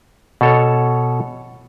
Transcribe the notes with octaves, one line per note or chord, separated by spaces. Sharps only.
B2 A4 C#5